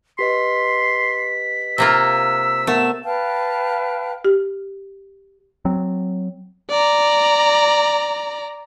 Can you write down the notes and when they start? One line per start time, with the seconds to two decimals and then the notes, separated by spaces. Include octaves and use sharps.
0.19 G4 B4 D#5 C6 B6
1.78 C3 A#3 F4 E6
2.67 A3 B3 A#4 F#5 E7
3.05 B4 F5 G5 A5
4.25 G4
5.65 F#3 C4
6.70 D5 A#5